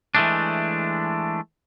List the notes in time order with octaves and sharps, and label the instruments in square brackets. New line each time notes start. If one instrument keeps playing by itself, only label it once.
[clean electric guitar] E3 G#3 A3 D4